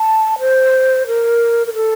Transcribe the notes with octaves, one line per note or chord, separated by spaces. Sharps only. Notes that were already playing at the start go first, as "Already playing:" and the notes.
Already playing: A5
C5
A#4
A#4
A4